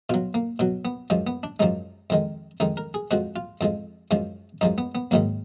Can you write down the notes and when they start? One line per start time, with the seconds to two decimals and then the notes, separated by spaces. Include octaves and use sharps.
0.09 B2 F#3 F4
0.34 A#3
0.59 B2 F#3
0.85 B3
1.10 F#2 F3 G#3
1.27 B3
1.43 D4
1.60 F#2 F3 G#3 D#4
2.10 F2 D#3 G#3
2.60 F2 D#3 G#3 D#4
2.77 A#4
2.94 G#4
3.11 F2 F3 G#3 F#4
3.36 F4
3.61 F2 F3 G#3
4.11 F#2 F3 G#3
4.61 F#2 F3 G#3 D#4
4.78 B3
4.95 B3
5.11 G#2 D#3 F#3 A#3